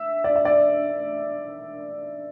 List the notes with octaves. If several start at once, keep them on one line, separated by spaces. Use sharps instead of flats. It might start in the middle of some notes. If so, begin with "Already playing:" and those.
Already playing: E5
D5
E5
D5